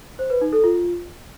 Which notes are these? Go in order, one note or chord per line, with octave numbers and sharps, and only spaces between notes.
C5
B4
D#4
A4
F4